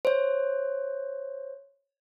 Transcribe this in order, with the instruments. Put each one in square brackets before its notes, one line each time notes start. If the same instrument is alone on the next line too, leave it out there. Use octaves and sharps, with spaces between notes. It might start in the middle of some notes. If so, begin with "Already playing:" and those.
[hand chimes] C5 C#5